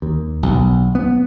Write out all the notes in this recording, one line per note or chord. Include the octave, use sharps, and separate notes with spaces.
D#2
B1
B3